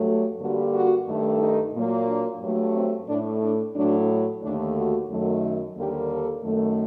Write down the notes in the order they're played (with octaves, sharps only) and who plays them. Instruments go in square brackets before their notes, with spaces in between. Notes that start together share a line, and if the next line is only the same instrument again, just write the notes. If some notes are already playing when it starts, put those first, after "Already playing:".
Already playing: [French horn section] G2 F#3 A3
G2 D3 G3 A#3 F#4
F#4
G2 D#3 A3
D#4
A#2 F#3 A#3
D4
G2 F#3 A3
C4
A2 A3 D4
D4
A2 F#3 A3 D4
D#2 D3 A3 D4
F#4
F#2 D#3 F#3 A3
D#2 D3 G3 A#3 G4
A4
F#2 D#3 A3